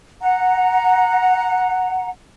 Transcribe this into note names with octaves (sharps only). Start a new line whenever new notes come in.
F#5 A#5